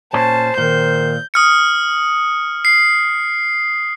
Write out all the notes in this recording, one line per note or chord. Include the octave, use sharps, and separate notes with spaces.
A#2 C#4 C5 A5
A#2 D#3 G6
D#6 F6 C#7
C7